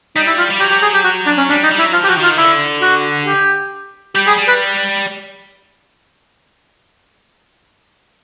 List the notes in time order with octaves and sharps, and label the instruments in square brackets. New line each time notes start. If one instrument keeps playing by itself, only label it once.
[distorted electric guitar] G3 [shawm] D#4
[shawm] E4
F4
[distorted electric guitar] G3
[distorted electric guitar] F#3 [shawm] G4
[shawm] G4
G#4
G4
F#4
D4
C#4
[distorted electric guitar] G3 [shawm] D4
[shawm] D#4
[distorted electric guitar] G3
[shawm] E4
[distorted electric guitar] F#3
[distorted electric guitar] F3 [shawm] F4
[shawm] G4
F#4
[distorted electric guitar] D#3
[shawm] F4
[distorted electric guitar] D3 [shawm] E4
[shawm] F#4
G4
[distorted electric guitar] G3 [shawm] G4
[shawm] G#4
[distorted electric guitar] G3
[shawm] B4